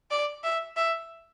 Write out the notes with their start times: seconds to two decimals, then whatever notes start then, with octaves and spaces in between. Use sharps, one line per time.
0.11 D5
0.44 E5
0.77 E5